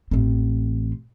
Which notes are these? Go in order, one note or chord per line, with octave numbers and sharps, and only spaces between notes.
A1 C4